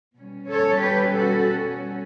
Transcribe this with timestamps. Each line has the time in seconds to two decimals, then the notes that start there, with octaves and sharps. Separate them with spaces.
0.17 B2 G3 C#4
0.50 A4 C#5
0.82 G4 B4
1.14 F#4 A4